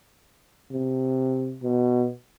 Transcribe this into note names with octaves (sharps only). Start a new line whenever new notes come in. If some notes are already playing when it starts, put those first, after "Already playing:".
C3
B2